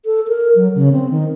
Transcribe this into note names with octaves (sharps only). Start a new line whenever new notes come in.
A4
A#4
F#3
C#3
C4
D#3